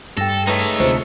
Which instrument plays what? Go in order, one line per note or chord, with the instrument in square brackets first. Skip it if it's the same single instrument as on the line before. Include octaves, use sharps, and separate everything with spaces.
[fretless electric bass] G2 [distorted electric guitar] A4 [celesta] G5 A#6
[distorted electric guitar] G#3 C#5 [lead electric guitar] A3 D#4 [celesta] B4
[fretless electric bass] D2 C3 [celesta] F4 C5